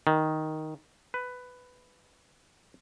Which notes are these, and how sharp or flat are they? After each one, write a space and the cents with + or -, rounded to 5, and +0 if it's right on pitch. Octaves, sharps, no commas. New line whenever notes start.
D#3 +5
B4 +10